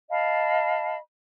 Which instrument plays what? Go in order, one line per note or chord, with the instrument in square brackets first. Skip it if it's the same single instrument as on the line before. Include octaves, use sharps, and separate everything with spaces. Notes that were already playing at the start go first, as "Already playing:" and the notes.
[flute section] D#5 F5 A5 B5